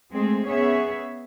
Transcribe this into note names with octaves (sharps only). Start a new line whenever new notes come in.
G#3 A3 C4 G#4
B3 C#4 G#4 C#5 E5